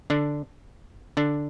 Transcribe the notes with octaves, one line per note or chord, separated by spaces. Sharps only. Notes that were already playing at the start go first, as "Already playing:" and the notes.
D3 D4
D3 D4